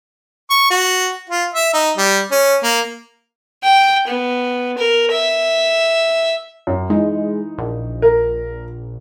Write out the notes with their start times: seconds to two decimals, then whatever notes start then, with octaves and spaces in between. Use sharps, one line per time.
0.50 C#6
0.70 F#4
1.30 F4
1.54 E5
1.73 D#4
1.97 G3
2.31 C#4
2.63 A#3
3.63 G5
4.07 B3
4.78 A#4
5.12 E5
6.67 F#2
6.90 E3 G#3 D#4
7.58 A#1
8.02 A#4